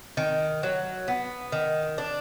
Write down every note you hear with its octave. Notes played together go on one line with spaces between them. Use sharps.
D#3
F#3
B3
D#3
D4